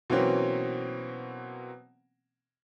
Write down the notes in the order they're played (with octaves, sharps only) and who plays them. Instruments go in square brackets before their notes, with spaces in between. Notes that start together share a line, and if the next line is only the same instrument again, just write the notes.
[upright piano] B2 E3 F#3 A#3 C4 C#4